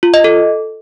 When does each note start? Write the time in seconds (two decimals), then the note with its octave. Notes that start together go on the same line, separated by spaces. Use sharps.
0.03 F4
0.14 D#5
0.24 A4